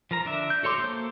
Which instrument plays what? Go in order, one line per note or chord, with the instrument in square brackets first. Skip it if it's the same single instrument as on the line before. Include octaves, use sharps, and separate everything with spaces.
[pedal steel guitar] F3 A#4 A#5
D3 D4 E5
G6
F#4 A4 C#5 C6 D6
A#3 A4 C5